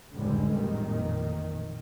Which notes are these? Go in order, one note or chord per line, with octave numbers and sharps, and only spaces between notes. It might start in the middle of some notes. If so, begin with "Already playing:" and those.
F1 C#2 A2 D3 G3 G#3
A1 F2 A#2 D#3